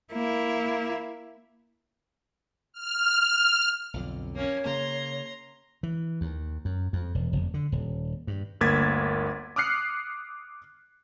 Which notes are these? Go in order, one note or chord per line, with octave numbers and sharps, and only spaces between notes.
A#3 E4
F6
B1 F2 D3
A#3 C#4 C#5
C#3 A#3 A#5 C6
E3
D#2
F#2
F2
E1
F1
D3
D#1
G2
G1 D2 A#3 G#6 A6 B6
D6 D#6 F6 F#6 C7 C#7